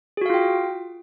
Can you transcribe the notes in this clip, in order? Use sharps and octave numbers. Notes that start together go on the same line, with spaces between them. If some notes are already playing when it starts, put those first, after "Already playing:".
F4 F#4 G#4 F5 G5